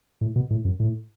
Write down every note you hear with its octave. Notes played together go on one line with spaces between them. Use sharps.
A2
B2
A2
F#2
A2